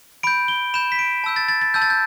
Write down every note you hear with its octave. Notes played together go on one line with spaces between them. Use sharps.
B5 G6 D7
G7
B5 G6 E7
B6
D7
A5 E6 G6
A6
A6
A6
A5 E6 G6
A6
G6